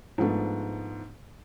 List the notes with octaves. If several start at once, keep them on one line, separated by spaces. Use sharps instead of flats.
G#2 F3 G#3 A3 B3 D4